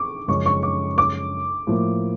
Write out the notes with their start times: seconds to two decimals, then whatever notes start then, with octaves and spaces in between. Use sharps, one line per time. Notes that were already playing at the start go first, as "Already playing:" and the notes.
Already playing: C#6 D6
0.28 F#2 C#3 F3 G#3 C#4 C#6
0.46 C#6
0.63 D6
0.98 D6
1.67 A2 F3 A#3